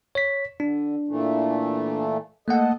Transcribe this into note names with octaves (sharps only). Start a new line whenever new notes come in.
C#5 B6
D3 D4
A#2 E3 A3
A3 A#3 A4 D#5 F#5